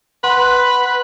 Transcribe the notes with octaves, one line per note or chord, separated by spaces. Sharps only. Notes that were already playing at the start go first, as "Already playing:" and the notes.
B4 F#5 C6